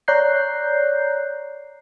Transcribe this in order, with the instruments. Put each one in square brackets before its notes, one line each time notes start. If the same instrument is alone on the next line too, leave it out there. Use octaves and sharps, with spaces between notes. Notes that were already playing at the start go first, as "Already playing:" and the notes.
[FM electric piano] C#5 D5 A#5 F#6 G6 C7